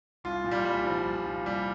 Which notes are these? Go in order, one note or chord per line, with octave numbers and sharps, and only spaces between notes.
C2 F4
A#2
G3
C2 G3
A#2 F3
C2
A#2
C2 G3